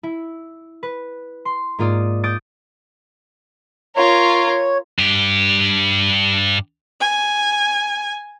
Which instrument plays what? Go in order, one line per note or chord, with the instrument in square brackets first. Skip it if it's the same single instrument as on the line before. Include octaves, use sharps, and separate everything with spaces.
[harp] E4
B4
C6
G#2 A#3 F4 D5 D#6
D6 D#6 G6 A6 D7
[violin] F4 A#4 [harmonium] C#5
[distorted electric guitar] G2 G4
[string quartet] G#5